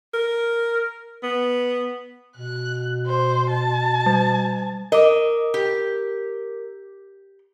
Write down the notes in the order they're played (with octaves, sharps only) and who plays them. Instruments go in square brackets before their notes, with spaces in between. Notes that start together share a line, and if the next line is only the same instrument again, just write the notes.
[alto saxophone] A#4
B3
[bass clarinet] B2 [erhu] F#6
[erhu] C5
A5
[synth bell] G3
[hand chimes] A#4 D6 [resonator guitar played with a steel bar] D#5
[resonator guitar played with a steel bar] G4